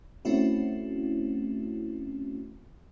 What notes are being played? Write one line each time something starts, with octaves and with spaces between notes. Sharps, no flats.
A3 C4 C#4 E4 F#4